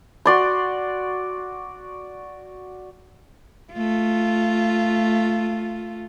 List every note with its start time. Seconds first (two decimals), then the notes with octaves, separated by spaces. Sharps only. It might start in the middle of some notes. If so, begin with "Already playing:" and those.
0.26 F#4 D5 C6
3.73 A3 F4